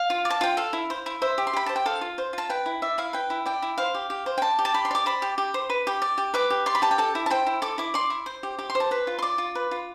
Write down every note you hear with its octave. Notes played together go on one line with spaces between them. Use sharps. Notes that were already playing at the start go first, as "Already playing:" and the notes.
Already playing: F5
F4
D5
A5
F4 G5
A4 F5
E4
C5
E4
C5 E5
G4
C6
G4 B5
C5 A5
G5
A4 F5
F4
C5
F4 A5
B4 G5
E4
D5 E5
E4 F5
B4 G5
E4
D5 G5
E4
C5 F5
G4
G4
C5
G5
D5 A5
G4
A5
G4 B5
C6
D5 D6
C5 B5
G4
G4
C5
B4
G4
D5
G4
B4 D6
G4
D5 C6
B5
G4 A5
G5
A4 A5
E4
A5
C5 G5
E4
A4 D6
E4 D6
D5 C6
E4
C5
G4
G4 D6
C6
C5
A5
B4 B5
F4
C6
D5 D6
F4
B4
F4